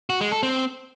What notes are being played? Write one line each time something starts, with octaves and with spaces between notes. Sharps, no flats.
F#4
G#3
A4
C4